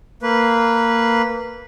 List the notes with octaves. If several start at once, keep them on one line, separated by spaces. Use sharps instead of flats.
A#3 B4